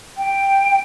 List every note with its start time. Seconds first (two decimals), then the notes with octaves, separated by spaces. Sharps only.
0.17 G5